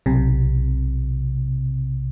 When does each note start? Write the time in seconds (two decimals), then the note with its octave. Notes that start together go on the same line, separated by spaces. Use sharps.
0.06 B1 C3